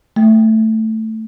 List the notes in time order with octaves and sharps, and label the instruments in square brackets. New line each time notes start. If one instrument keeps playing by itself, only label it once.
[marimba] A3